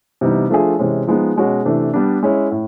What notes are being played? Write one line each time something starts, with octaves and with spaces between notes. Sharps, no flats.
C3 E3 G3 B3 D#4
F3 A3 D4 F4 G#4
C3 E3 G#3 C#4
F3 G#3 B3 D#4
B2 G#3 C#4 F#4
C3 E3 A3 D4
G3 B3 D4
G#3 C#4 E4
A2